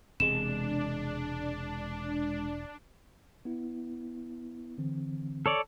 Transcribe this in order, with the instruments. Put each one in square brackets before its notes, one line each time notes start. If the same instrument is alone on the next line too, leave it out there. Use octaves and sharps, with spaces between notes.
[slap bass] E1 [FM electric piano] C3 G#3 [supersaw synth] D4 [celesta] E7
[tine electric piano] B3 E4
D3 E3 C4
[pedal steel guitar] A4 C#5 D5